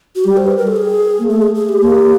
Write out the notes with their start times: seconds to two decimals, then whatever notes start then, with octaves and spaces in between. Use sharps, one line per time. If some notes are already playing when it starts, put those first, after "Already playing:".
0.16 F#4
0.24 G3 G4
0.37 C5
0.47 B4
0.57 A#4
0.67 A4
0.76 G#4
1.19 A#3
1.29 A3 A4
1.42 G#4
1.55 G#4
1.69 G4
1.82 A#3